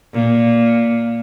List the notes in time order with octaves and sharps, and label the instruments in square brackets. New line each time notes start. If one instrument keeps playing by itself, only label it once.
[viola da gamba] A#2